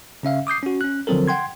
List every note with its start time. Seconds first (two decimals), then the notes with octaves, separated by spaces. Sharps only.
0.23 C#3 C#4 E5 F5
0.47 D6 D#6 G6 C7
0.63 C#4 F#4
0.81 C#4 F#6
1.07 D3 F3 F#3 C4 A4 A#4
1.28 F#5 G5 C6 G#6